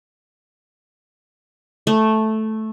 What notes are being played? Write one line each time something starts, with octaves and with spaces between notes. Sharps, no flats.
A3